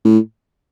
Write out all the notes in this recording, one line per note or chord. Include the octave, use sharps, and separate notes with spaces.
A2